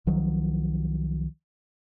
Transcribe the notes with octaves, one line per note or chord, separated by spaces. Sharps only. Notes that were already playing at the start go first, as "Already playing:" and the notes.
C2 D#3 F3 F#3